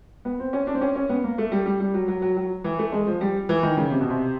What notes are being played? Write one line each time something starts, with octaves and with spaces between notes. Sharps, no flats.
B3
C4
C#4
D4
C4
C#4
C#4
B3
A#3
A3
G3
G3
G3
F#3
F#3
F#3
F#3
E3
A3
G#3
F3
G3
E3
D#3
C#3
C3
B2
C3